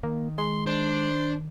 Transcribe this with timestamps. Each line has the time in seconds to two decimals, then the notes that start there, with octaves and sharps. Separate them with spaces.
0.03 D#3 A#3
0.38 G#3 C6
0.66 D4 C5